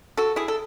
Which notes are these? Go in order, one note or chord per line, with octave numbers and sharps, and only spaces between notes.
F#4 A4
E4 G#4
A4